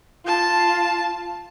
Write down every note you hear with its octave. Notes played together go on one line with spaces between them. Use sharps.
F4 A5